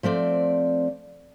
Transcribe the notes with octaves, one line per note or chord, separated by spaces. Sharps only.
F3 A3 C4 D5